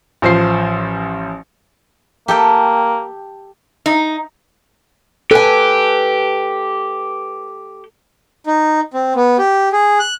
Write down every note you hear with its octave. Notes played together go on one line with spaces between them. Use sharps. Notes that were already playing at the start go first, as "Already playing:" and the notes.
A1 F3 C5 C7
A#3 G4 A4 G5
D#4
G4 A4 B4 G#5
D#4
C4
B3
G4
G#4
F#6